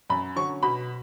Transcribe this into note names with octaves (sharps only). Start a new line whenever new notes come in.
F#2 B5
D3 F#3 C#4 C#6
B2 B5